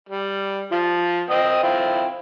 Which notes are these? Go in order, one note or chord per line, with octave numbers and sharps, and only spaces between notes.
G3
F3 F4
C4 D#5 D#6
C4 E4 F4